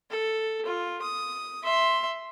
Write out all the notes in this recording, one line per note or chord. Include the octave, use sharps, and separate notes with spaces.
A4
F4
D#6
E5 C6